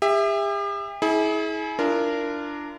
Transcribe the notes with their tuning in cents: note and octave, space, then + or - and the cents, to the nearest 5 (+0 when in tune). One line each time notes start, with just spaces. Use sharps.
G4 +45 E5 +0
E4 -30 G#4 +30
D4 +0 F4 -40 A#4 -10